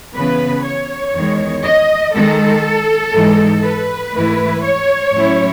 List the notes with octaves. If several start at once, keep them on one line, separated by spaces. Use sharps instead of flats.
C#3 E3 B3 B4
C#5
E2 D#3 G#3
D#5
D#3 G#3 D#4 A4
G#2 E3 G#3 D#4
B4
G#2 E3 A3 E4
C#5
A2 F#3 C#4 E4